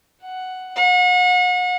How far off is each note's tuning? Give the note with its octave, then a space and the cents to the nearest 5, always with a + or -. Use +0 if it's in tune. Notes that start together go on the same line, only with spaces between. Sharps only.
F#5 +5
F#5 -40